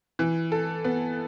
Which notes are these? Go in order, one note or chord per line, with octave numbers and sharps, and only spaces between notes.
E3
A4
B3